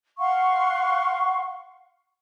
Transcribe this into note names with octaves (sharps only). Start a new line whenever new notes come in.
F5 F#5 C6 C#6